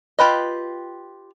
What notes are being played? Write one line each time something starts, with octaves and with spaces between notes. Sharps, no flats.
F4 G4 B4 D#5